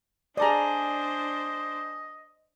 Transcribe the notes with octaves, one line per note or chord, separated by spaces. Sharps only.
D4 G#4 A4 C5 D5 D#5 A#5 D#6